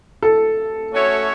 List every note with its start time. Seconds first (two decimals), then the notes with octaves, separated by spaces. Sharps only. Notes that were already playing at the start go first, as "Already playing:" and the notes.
0.22 A4
0.92 A3 C#4 F#4 C#5 E5